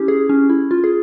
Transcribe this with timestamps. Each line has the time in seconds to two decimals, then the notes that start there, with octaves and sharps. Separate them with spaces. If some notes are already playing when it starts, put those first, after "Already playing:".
Already playing: C#4 E4 G4
0.08 G#4
0.29 C#4
0.50 E4
0.71 F4
0.84 G#4